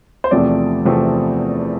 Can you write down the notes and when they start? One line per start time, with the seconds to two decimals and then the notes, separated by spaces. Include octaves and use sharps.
0.24 C5
0.31 E2 C3 F3 A3 C4 D5
0.85 E2 C3 F3 A3 C4